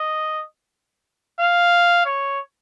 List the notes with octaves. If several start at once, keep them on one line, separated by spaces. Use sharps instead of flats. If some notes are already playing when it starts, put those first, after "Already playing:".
Already playing: D#5
F5
C#5